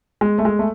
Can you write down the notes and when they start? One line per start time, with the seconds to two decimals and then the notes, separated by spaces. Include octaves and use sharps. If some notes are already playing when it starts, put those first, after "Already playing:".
0.21 G#3
0.38 A3
0.45 G#3
0.59 A3